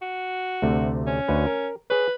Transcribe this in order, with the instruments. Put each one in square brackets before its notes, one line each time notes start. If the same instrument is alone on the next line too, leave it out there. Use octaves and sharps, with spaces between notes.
[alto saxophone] F#4
[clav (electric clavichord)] D2 C3 A3
[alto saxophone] C#4
[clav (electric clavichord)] D2 F#4 B4
A#4
[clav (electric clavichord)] G#4 C#5 [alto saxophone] B4